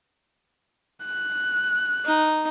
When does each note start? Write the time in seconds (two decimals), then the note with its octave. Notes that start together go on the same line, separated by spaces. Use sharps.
1.05 F#6
2.05 D#4